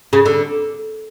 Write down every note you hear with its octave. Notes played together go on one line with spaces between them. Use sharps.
C#3
D3